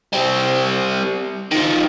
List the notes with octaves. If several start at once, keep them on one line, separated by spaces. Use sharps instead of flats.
G3 C4
D#3 F3